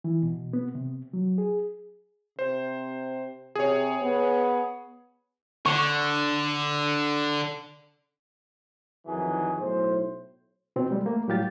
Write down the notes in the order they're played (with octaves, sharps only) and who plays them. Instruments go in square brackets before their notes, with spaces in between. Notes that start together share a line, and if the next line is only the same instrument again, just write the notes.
[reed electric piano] E3
B2
B3
C3
F#3
G#4
[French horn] C3 [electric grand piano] C5
[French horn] C3 [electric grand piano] G#4 C#5
[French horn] B3
[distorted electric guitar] D3 [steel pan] C#6
[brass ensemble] F2 D#3 E3 F#3 G#4
B1 A2 C5
[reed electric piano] B2 C4
G3 G#3
A3 A#3
A2 F#3 G3 G4 F5 A6